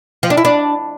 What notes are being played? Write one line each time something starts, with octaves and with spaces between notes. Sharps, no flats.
F3
D4
E4
D4